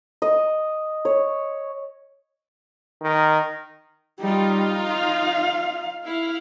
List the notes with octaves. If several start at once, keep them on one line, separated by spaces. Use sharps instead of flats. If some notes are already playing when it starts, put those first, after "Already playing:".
D#5
C#5
D#3
G3 D#4 F4
F5
E4 F5